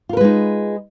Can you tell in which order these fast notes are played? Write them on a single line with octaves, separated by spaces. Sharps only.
F4 A#4 B4 G#3 D#4